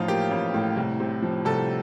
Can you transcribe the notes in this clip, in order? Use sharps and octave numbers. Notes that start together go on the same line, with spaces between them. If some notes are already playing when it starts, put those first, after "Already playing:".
Already playing: A1 A2 F3 D#4 F4
A#3 G4
A1
A2
C2
C3
F3
C2 A4